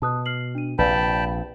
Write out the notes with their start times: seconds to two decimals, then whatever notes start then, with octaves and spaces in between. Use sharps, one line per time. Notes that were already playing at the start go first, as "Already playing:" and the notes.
0.02 B2 A5 D#6 F#6
0.26 F6 C7 F#7
0.55 D4 D#7
0.79 A#1 C3 B4 D5 F5 G5 A5 B5